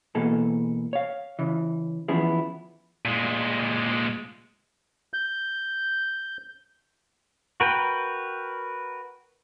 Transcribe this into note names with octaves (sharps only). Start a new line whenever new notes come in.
B2 E3 A#3 G#4 A4
C#5 F5
C#3 E3
E3 F3 B3 C#4 E4 G#4
A#2 G#3
G6
F#4 A#4 B4 G5